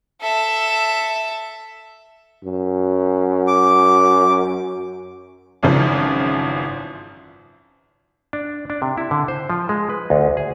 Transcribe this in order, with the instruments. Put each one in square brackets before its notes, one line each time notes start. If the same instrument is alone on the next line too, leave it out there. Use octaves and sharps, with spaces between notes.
[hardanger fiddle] A4 E5
[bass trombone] F#2
[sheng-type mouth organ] D6
[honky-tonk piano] G#1 F#2 C#3 E3 F3
[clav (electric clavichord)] D4
D4
C3
E4
D3
C5
F3
G#3
B4
D2
G#4